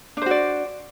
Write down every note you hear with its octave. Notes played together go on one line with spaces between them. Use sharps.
D4 F#4 C5 D5